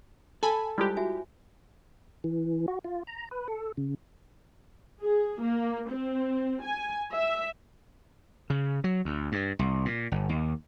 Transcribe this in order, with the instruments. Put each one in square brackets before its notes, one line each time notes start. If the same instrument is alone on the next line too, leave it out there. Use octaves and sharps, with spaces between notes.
[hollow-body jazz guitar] A4 [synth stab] G#5 B5
[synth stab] G3 G#3 G4 [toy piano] E4 F4 C5
[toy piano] F#4 E5 G#5
[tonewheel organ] E3
F#4
F4
A#5
B4
A4
C#3
[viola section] G#4
A#3
C4
G#5
E5
[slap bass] C#3
F#3
D2
G2
C2
A#2
G1
D#2